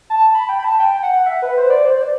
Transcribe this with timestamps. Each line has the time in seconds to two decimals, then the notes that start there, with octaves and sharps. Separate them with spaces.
0.10 A5
0.34 B5
0.49 G5
0.59 B5
0.64 A5
0.79 G5
1.03 F#5
1.15 F#5
1.26 E5
1.42 B4
1.57 C5
1.70 D5
1.85 C5
1.98 D5